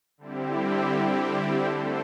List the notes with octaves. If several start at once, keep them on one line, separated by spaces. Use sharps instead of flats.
D3 G3 C4 E4 G4
D3 A3 D4 A4 C5